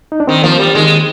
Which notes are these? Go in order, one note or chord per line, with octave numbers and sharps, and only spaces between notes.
D#4
D4
D#3 C4
F3 A#3
G3
D#3 G#3